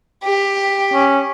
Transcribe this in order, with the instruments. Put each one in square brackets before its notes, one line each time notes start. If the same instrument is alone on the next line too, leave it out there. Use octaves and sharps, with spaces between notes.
[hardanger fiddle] G4
[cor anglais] C#4